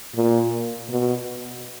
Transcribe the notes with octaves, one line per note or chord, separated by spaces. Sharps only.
A#2
B2